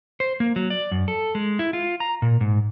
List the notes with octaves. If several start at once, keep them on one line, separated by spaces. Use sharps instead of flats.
C5
A#3
F#3
D5
F#2
A4
G#3
E4
F4
A#5
A#2
G#2